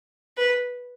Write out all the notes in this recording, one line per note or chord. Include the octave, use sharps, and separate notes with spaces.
B4